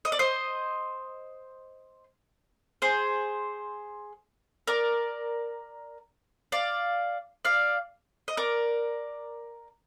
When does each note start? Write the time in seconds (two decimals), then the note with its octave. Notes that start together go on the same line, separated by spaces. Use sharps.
0.05 D#5
0.12 D5
0.19 C5 D#5
2.82 G#4 C5
4.67 A#4 D5
6.52 D5 F5
7.45 D5 F5
8.28 D#5
8.37 A#4 D5